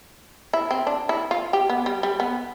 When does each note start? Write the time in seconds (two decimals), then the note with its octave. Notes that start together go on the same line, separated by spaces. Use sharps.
0.53 E4
0.71 C4
0.87 D4
1.09 E4
1.31 F4
1.53 G4
1.69 B3
1.86 G3
2.03 G3
2.20 B3